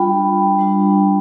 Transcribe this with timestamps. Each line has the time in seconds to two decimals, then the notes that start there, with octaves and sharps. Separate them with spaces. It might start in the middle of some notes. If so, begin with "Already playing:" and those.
Already playing: G3 D4 F4 G5 B5
0.59 G3 D4 F4